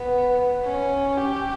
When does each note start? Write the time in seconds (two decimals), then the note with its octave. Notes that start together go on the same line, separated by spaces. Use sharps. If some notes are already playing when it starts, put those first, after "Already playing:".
Already playing: B3
0.65 C#4
1.17 G4